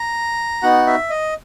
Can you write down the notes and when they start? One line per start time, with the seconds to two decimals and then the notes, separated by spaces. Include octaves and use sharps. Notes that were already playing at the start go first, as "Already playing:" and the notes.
Already playing: A#5
0.63 B3 D#4 F#4 F#5
0.87 E5
1.10 D#5